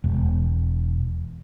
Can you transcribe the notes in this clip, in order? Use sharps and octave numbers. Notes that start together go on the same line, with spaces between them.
E1